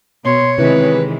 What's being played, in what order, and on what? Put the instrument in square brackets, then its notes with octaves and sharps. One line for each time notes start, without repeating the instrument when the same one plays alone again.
[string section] B2 [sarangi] C#5 [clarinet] C6
[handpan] C3 E4 [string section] D#3 E3 G#3 [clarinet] B4